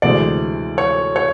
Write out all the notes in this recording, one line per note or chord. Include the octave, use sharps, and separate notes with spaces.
D2 C3 E3 G#3 C4 D5
C#5
C#5